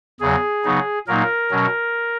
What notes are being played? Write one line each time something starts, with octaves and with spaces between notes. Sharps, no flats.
E2 C#3 F#3 G#4
C#3 F#3 B3 D#4
A#2 F#3 A#3 D#4 A#4
B2 F#3 C#4